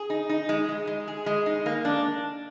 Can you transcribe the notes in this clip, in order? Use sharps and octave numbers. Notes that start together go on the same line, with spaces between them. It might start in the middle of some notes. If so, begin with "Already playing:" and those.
Already playing: G#4
D#4
D#4
G#3
G#3
G#3
G#4
G#3
D#4
A#3
D4